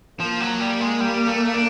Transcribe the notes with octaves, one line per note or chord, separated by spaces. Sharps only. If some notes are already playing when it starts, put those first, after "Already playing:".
F3 A#3
F#3
G3
G#3
G3
A3
D4